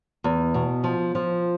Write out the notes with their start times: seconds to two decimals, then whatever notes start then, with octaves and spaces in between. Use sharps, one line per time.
0.24 E2
0.54 B2
0.84 F3
1.15 F3